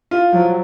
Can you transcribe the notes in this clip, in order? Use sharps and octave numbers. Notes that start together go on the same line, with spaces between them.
F4
F3 F#3